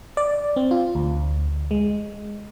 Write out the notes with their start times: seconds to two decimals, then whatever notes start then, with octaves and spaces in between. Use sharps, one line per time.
0.17 D5
0.56 C4
0.71 F4
0.95 D2
1.71 G#3